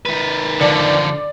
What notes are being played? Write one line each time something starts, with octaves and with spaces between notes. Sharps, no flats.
D#3 B4
D3 F3 D5